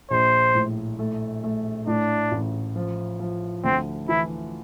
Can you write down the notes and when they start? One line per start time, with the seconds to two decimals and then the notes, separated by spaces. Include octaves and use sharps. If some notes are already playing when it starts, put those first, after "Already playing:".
0.10 A#1 C5
0.55 A2
0.99 A3
1.43 A3
1.87 A2 D4
2.31 A1
2.76 F3
3.20 F3
3.64 D2 C4
4.08 E3 E4